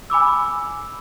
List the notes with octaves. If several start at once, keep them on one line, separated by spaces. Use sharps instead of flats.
G#5 B5 D6 E6